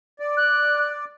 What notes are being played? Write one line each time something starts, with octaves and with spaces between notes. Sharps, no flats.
D5
F#6